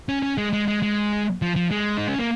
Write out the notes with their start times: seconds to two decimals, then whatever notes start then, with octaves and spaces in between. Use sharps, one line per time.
0.09 C#4
0.23 C#4
0.38 G#3
0.53 G#3
0.68 G#3
0.82 G#3
1.42 F3
1.56 F3
1.71 G#3
1.97 D#4
2.08 C#4
2.19 A#3